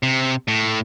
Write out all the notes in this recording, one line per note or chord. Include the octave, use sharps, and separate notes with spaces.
C3
A2